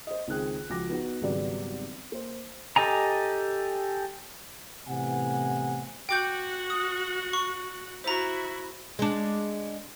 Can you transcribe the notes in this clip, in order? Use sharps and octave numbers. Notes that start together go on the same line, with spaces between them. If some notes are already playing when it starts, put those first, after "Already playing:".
C5 D#5
C#2 D#3 C4 G#4 F#6
C#2 F3 F#4 D6 A#6
B3 D#4 F#4
G#1 C#3 F#3 G3 B3 D5
A#3 C5
G4 A4 D#5 G#5 A#5
A2 C3 E3 B3 F#5 G#5
F#4 F#5 G5 D6 G6
D#6
C#6
E4 F#4 C5 A#5
G#3 D4